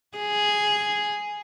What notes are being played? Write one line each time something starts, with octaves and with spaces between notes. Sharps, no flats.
G#4